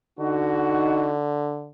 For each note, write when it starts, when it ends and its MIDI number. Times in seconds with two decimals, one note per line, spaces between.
0.20 1.70 50
0.20 1.16 63
0.20 1.16 66